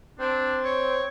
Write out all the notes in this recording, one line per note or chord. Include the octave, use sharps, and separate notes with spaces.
C4 D4
C#5